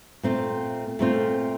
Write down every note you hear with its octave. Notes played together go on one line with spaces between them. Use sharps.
A#2 A3 C4 F4
A#2 A3 C4 F4